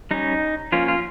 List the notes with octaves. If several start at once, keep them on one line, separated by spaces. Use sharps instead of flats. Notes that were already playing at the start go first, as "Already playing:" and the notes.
G3 C#4 D#4
F3 A#3 C#4 F4
F4